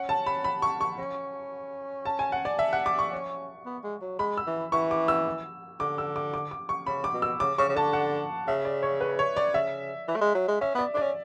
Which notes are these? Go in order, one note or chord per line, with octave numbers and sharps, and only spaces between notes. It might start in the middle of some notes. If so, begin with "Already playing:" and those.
Already playing: C#4 F#5
A5
B5
B5
C#6
C#6
C#4
A5
G#5
F#5
D5
E5
F#5
D6
C#6
C#4
B3
G#3
F#3
G#3 B5
E6
E3
E3 C#6
D6
E6
D3 D6
E6
D6
D6
D6
C#6
C#3 B5
D6
B2
E6
C#3 D6
C#3 C#6
C#3
D3 A5
F#5
C#3 E5
D5
C#5
B4
C#5
D5
C#3 E5
E3
A3
G#3
F#3
G#3
C#4 E5
B3 D5
D4
C#4 D5